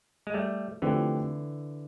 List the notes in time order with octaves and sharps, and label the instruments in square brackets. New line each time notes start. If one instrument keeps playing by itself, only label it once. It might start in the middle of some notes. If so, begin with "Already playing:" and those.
[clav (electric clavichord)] G#3
G3 A3
[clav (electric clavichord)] D3 E3 [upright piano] F3 A3 C4 E4 G4